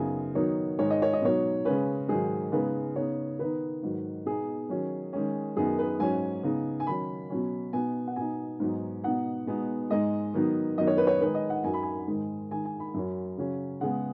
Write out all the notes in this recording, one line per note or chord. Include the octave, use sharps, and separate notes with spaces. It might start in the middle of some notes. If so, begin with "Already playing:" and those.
Already playing: F#2 C#3 B3 D#4 G#5
D#3 F#3 B3 D#4 C#5
G#2 D#3 G#3 D#4 C#5
D#5
C#5
D#5
B2 F#3 D#4 C#5
C#3 G#3 C#4 B4
G#2 D#3 F#3 G#4
C#3 G#3 B3 D#4 B4
C#3 B3 D#4 C#5
D#3 B3 D#4 B4
G#2 D#3 F#3
B2 B3 D#4 G#4
D#3 F#3 C#4
D#3 G#3 C#4
F#2 D#3 B3 D#4 G#4
B4
G#2 F#3 C#4 G#5
C#3 B3 D#4
G#5
D#3 F#3 C#4 B5
B2 F#3 C#4
B2 B3 D#4 G#5
F#5
B2 B3 D#4 G#5
G#2 F#3 B3 D#4
B2 B3 D#4 F#5
B2 G#3 B3 D#4
G#2 G#3 D#4 D#5
D#3 F#3 B3 D#4
F#2 D#3 F#3 B3 D#4 D#5
C#5
B4
C#5
D#3 G#3 D#4 B4
D#5
F#5
F#2 F#3 D#4 G#5
B5
G#5
G#2 D#3 G#3
D#3 G#3 D#4 G#5
G#5
B5
F#2 F#3 C#4
C#3 F#3 C#4
C#3 G#3 B3 F#5